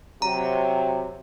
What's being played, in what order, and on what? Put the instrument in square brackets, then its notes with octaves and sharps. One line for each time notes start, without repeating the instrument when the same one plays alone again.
[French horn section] C3 F#3 [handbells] A#5